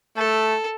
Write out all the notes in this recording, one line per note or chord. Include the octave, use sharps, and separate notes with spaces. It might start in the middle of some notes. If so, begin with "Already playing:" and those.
A3 A4